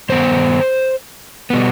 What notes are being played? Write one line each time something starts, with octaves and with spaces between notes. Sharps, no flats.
G2 D#3 B3 C5
B2 G3 B3